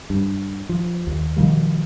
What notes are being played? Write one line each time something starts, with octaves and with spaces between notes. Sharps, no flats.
G2
F3
D#2
B2 D#3 F3 G3